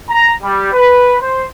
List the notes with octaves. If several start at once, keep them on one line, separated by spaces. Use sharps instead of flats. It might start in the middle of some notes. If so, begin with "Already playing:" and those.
A#5
G3
B4
C5